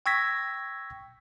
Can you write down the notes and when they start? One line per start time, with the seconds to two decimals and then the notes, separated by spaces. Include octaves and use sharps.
0.06 G5 C#6 E6 G#6 A#6 B6